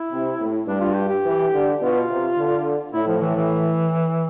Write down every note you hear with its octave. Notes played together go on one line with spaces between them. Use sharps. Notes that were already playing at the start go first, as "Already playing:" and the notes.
Already playing: E4
C3
A2
G2 D4
F4
G4
G4
E3
D3
B2 F4
C3
D3
A2 E4
F3
E3
E3